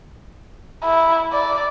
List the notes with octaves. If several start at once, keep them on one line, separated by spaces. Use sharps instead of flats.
E4
D5